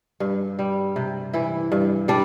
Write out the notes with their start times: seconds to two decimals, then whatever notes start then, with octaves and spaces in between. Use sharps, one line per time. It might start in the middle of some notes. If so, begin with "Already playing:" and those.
0.20 G2
0.59 G3
0.96 C3
1.33 E3 E4
1.72 G2
2.08 G3 D4